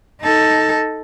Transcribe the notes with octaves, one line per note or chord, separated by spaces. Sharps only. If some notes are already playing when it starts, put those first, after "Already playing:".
D#4 A4